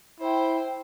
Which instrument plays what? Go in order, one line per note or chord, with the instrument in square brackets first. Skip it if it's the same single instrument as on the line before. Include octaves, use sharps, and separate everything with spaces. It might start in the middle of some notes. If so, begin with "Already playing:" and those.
[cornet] E4 [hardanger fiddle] C5 G5